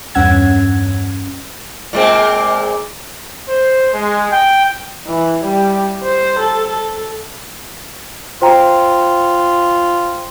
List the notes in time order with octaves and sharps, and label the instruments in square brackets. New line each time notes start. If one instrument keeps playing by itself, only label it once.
[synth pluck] E2 G2 C#4 F#5 E6 G#6
[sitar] A#2 G#3 C4
[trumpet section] C5
G#3
G5
[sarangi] E3
G3
C5
A4
A4
[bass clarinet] F4 [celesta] C5 G5 A#5